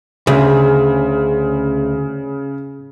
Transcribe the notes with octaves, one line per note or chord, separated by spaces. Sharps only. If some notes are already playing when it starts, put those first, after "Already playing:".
D2 C#3 G#4